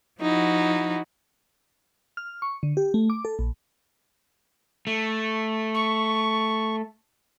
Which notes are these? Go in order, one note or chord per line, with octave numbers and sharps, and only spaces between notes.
F3 D#4 E4 F#4
F6
C#6
D3
G4
A3
D6
A4
A#1
A3
C#6